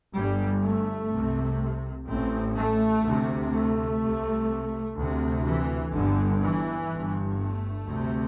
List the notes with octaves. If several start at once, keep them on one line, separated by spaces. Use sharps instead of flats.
G1 G2 G3
A3
C2 C3
A1 A2 C4
A3
D2 C3
A3
C2 C3
D2 C3
E3
G1 G2 D3
E3
G1 G2
A3
D2 C3